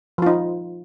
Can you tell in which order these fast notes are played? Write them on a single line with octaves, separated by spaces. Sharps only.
F3 F4 D#4